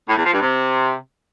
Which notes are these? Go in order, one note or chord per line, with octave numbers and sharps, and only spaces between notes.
A2
E2
F3
G2
C3